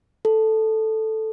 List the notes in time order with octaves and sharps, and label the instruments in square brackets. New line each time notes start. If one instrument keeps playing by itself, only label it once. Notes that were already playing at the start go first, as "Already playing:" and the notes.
[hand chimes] A4